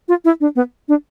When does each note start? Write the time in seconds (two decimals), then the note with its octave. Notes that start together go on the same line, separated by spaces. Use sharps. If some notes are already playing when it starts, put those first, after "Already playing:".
0.08 F4
0.25 E4
0.40 D4
0.56 B3
0.88 D4